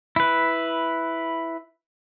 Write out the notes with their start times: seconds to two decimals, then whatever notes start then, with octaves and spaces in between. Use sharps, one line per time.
0.16 E4 B4